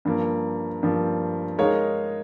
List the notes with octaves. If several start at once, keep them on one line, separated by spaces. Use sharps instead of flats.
G2 F3 A#3
G2 F3 A#3
G#3 D#4 A#4 C#5 F5